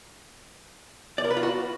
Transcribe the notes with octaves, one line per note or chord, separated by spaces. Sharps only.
D5
A#4
B4
F4
F#4